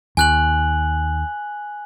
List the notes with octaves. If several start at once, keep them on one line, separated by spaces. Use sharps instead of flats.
D#2 G#5 F#6 F#7